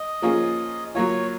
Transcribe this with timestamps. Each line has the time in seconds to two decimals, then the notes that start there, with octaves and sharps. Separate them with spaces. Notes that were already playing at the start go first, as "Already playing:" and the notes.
Already playing: D#5
0.22 F3 A#3 C#4 F4 G#4
0.95 F#3 A#3 F4 C#5